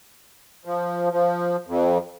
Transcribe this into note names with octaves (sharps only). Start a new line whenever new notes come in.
F3
F3
F2